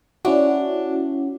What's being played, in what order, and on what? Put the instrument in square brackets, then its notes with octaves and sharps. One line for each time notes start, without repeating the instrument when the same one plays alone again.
[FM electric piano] C#4 E4 F#4 [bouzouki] D4